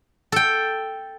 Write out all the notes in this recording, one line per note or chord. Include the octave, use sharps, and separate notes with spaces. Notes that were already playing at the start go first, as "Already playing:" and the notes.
A4 G5